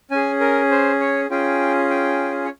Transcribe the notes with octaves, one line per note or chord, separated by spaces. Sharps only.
C#4 G#4 G#5
A#4
C5
C#5
C#4 F4 G#4 G5
G5
C#5